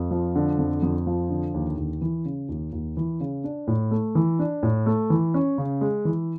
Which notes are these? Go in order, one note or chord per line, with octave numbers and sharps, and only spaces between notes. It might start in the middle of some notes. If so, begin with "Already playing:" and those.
Already playing: F2
F3
D3
F2
F2
F3
D3
D#2
D#2
E3
C#3
D#2
D#2
E3
C#3
D4
A2
A3
E3
D4
A2
A3
E3
C#4
C#3
G#3
E3